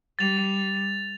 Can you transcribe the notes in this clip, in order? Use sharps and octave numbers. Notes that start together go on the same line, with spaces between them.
G3 A6 F7